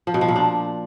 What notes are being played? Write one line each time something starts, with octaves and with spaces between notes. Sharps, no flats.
F3
B2
F3
A#2
D4